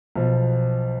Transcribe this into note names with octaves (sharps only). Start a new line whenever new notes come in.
B1 F3